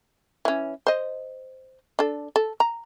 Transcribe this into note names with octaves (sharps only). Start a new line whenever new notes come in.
E3 C#4
C5 D#5
D4 A4
A4
A#5